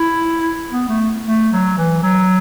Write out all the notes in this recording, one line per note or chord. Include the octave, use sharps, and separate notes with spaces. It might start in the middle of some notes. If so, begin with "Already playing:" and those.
Already playing: E4
B3
A3
A3
F#3
E3
F#3